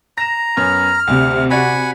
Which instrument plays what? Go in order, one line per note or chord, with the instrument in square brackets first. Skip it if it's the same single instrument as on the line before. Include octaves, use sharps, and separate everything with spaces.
[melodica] A#5 [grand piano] A#6 E7
[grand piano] F#2 B3 C#4 [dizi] F6
[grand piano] D2 [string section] C3
[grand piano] F#4 C#5 D5 [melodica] F#5 G#5 B5